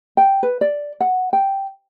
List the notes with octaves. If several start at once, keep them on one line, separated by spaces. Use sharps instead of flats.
G5
B4
D5
F#5
G5